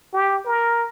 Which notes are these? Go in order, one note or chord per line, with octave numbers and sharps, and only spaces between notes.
G4
A#4